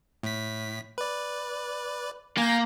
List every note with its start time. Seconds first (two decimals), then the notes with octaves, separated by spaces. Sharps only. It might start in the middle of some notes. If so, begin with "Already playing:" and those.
0.23 A2 B6
0.98 B4 D5
2.37 A#3 G#5 G6